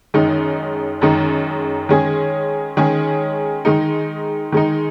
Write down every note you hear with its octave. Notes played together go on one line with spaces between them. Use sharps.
F#2 D#3 G#3 D#4
F#2 D#3 G#3 D#4
D#3 G#3 C#4 G#4
D#3 G#3 C#4 G#4
D#3 G#3 D#4
D#3 G#3 D#4